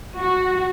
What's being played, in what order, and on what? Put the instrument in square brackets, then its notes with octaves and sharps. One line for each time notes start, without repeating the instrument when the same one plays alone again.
[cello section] F#4